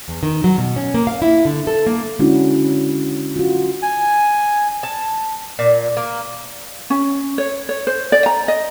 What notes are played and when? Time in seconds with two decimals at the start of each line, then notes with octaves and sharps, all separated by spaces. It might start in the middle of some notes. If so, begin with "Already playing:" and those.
0.08 E2
0.23 D#3
0.44 F#3
0.58 B2
0.76 C#4
0.94 A#3
1.07 F5
1.22 E4
1.45 D3
1.67 A4
1.87 A#3
2.19 D3 G#3 C#4 D4 E4 F#4
3.36 F4 F#4
3.82 G#5
4.83 A5
5.59 A#2
5.97 A#3
6.90 C#4
7.38 C#5
7.69 C#5
7.87 C5
8.12 D5
8.26 A#5
8.48 D#5